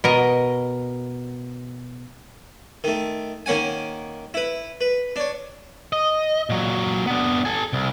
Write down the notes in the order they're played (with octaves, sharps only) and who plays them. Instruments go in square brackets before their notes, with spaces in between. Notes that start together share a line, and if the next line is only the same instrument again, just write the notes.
[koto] B2 A#4 D#5
[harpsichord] D#3 A3
D#3 A#3 C#4 F#5 G#5
E4 B4
B4
D4 C#5
[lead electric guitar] D#5
A#2 F#3
B3 D4
A4 G#5
C2